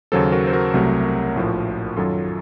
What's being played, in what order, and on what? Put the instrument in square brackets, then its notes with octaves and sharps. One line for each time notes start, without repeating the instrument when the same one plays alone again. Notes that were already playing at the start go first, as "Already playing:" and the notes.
[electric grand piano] D#2 C#3 F#3 A#3 A4 C5
F#4 A#4
C5
F#4 A#4
C2 C3 F#3 A3
A#1 A2 F3
F#2 D#3 F#3 F4 A4